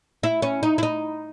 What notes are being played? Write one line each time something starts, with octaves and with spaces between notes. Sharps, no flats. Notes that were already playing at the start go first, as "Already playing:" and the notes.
E4
C#4
D#4
E4
D#4